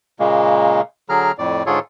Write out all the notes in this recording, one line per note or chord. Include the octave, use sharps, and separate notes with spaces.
A#2 C#3 G#3 A#3
D3 F#3 G#4 A#5 F6
F2 A2 D5
G#2 D3 F4 G#4 A4 C#5